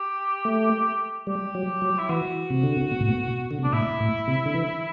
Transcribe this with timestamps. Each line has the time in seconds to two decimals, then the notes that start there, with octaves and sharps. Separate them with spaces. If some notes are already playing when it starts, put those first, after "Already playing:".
Already playing: G4
0.45 A3
1.27 G3 G4
1.55 F#3
1.82 F#3
1.98 E4
2.09 E3 F#4
2.50 C3
2.63 D3
2.77 C3
2.91 B2
3.01 A2
3.09 B2
3.51 D3
3.59 C3
3.63 B2 D4
3.73 A2 E4
4.00 A2
4.28 C3
4.46 D3
4.55 E3